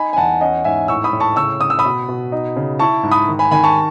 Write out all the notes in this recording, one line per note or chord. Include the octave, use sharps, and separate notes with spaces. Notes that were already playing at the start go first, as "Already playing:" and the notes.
Already playing: D#4 G#5 B5
G#5
E2 F#5 A5
C#4 D#5 F#5
G#2 E5 G#5
A2 C#6 E6
B5 D#6
A2
A5 C#6
C#3 C#6 E6
C#3 D#6
E6
B5 D#6
B2
B2
D#4
C#3
E4 A5 C#6
G#2
B5 D#6
D#3
G#5 B5
D#3 G#5 B5
A5 C#6